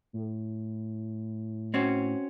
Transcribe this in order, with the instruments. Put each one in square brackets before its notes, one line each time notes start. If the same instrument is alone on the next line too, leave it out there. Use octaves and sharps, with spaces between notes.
[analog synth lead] A2
[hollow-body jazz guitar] C4 C#4 F#4